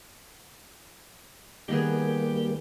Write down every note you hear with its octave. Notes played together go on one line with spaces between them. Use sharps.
D#3 G3 A#3 B3 G4 G#4